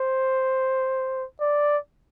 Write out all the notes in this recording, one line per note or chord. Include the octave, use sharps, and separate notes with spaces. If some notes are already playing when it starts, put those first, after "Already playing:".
Already playing: C5
D5